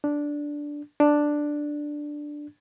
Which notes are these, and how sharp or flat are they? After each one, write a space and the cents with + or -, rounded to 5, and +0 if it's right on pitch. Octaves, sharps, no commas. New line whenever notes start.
D4 -5
D4 +5